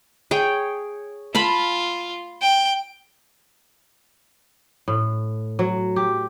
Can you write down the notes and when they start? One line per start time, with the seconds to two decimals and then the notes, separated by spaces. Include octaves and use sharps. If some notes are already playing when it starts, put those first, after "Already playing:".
0.31 G#4 C#5 G5
1.35 F4 F5 A5 B5
2.41 G5
4.88 A2
5.59 F#3
5.96 G4